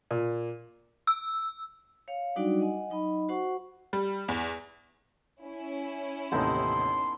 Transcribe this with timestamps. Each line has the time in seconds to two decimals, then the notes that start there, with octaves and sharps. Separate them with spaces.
0.11 A#2
1.07 E6
2.08 C#5 F5
2.36 F#3 G3 D4 D#4 F#4 D5
2.60 D#5 F#5 G#5
2.90 F#3 D#4 D#5 B5
3.29 F#4 C5 F#5 C#6
3.93 G3
4.28 E2
5.43 C#4 E4
6.32 A1 D#2 C3 B3 D#4 A4 C6